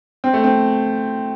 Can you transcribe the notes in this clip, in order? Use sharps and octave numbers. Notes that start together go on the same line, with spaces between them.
C4
A3
C4